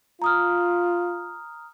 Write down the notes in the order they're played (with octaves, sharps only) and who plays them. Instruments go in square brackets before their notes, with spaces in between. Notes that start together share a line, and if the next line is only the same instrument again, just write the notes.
[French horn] F4 [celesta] A#5 D#6 F6